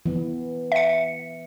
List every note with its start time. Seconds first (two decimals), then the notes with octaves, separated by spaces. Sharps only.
0.06 E3 B3
0.72 E5 C#7